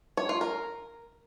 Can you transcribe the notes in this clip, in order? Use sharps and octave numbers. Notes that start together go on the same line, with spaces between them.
C#5
F4
A#4